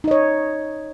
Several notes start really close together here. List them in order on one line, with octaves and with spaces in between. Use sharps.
D#4 D#5 C#5